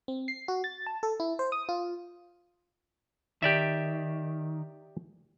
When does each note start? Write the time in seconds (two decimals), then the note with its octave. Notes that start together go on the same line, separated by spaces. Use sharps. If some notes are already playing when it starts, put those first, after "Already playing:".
0.08 C4
0.28 C7
0.48 F#4
0.64 A6
0.86 A5
1.03 A4
1.20 E4
1.39 C5
1.52 D#6
1.69 F4
3.42 D#3 G4 D5 E5